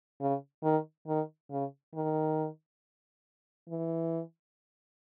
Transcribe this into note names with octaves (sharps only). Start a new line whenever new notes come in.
C#3
D#3
D#3
C#3
D#3
E3